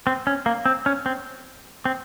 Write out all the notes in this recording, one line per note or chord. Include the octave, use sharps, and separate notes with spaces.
C4
C#4
A#3
C4
C#4
C4
C4